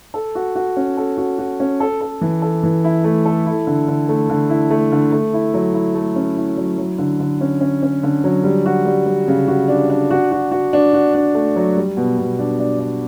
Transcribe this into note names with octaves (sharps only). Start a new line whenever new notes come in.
A4
F#4
F#4
C#4
A4
F#4
F#4
C#4
A4
A4
E3
A4
E3
E4
A3
A4
E4
D3
D3
A3
D3
E4
A3
D3
A3
E4
F#3
E4
A3
C#4
E4
F#3
F#3
D3
D3
C#4
C#4
C#4
D3
F#3
G3
F#4
G3
G3
C#3
F#4
D4
D4
F#4
F#4
F#4
D4
F#4
D4
A3
F#3
G3
B2
B2
D4
D4
D4